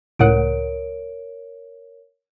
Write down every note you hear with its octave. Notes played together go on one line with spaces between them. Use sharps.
C#2 A2 A#4 C#5 F#5 D7